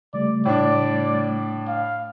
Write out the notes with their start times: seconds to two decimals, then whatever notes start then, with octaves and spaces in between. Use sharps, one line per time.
0.14 C#3 G3 A3 D5
0.45 A2 D4 D5
1.67 F5